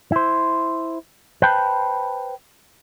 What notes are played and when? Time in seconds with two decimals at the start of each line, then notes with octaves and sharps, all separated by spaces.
0.12 E4 C5
1.42 B4 C5 G5 A5 B5